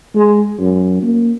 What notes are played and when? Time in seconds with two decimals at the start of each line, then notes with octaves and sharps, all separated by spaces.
0.15 G#3
0.59 F#2
1.02 A#3